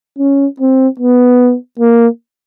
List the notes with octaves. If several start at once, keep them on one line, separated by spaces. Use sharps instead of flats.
C#4
C4
B3
A#3